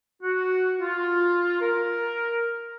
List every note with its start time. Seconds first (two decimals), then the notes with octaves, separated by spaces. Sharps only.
0.22 F#4
0.80 F4
1.61 A#4